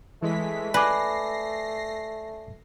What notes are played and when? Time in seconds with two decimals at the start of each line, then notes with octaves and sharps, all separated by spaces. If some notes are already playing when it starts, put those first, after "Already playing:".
0.22 E3 G#3 A3 B6
0.74 B4 D5 G#5 D6 A#6 C7